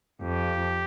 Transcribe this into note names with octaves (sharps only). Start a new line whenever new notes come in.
F2 G4